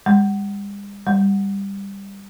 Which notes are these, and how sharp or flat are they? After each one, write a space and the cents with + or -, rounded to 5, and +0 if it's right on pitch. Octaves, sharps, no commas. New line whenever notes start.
G3 +45
G3 +15